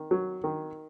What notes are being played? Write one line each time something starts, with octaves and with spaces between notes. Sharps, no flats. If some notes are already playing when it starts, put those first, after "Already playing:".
Already playing: D#3
F#3
D#3